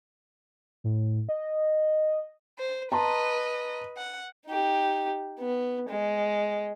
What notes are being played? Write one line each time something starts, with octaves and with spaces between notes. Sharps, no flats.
A2
D#5
C5
B4 D#5 A5 A#5 C6
F#5
D#4 G4
B3
G#3